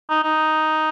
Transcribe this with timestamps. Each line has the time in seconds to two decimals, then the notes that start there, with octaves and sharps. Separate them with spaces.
0.09 D#4
0.23 D#4